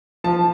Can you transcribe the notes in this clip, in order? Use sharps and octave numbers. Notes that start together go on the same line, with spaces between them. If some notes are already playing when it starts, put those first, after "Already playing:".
F3 A5